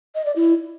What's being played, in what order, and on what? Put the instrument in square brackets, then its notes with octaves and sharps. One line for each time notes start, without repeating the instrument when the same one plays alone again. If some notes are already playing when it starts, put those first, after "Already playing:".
[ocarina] D#5
D5
E4